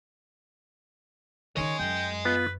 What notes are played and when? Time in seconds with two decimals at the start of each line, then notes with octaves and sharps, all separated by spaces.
1.57 D#3 C#4 C#5 D#5 G#5
1.79 F#2 G5
2.25 B3 F4 B4